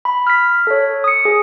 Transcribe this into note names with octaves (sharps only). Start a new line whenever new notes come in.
B5
F6 B6
A4 C#5
D#6 C#7
G#4